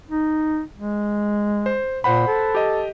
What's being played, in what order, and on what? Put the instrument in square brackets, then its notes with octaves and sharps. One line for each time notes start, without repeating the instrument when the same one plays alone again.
[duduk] D#4
G#3
[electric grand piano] C5
[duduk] A#2 [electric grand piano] C5 F#5 B5
[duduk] A4
[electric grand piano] G4 D#5